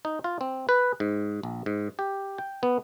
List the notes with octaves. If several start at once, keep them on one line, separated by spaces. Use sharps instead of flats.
D#4
F4
C4
B4
G#2
A#1
G#2
G4
G5
B3